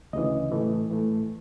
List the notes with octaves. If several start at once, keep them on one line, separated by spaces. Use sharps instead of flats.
D2 C#3 E3 D#5
A2 E3 A3
A2 E3 A3